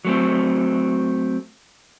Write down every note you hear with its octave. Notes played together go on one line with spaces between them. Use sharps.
F#3 A3 C4